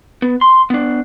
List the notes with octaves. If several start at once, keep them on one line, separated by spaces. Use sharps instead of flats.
B3
C6
B3 D4